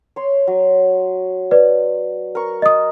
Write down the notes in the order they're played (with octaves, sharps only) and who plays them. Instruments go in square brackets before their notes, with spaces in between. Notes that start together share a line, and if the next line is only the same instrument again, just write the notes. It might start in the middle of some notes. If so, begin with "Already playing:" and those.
[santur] C#5 C6
F#3
[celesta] B4 D5
[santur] A#4 C#6
[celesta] D#5 D#6